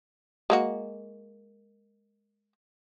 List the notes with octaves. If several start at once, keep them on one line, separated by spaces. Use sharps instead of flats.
G#3 A#3 F#4